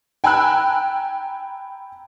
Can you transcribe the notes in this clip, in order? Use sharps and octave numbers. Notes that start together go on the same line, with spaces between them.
G5 G#5 A#5 B5 E6 F#6